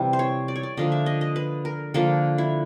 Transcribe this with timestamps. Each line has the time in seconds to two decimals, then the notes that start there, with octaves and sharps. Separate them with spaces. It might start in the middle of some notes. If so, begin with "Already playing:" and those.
Already playing: C3 E3 G3
0.13 C5
0.19 C#5
0.48 D5
0.56 C#5
0.63 D5
0.77 D3 F3 A#3 D#5
0.92 E5
1.06 D#5
1.21 D#5
1.36 B4
1.65 A#4
1.94 D3 F3 A#3 A4
2.38 E4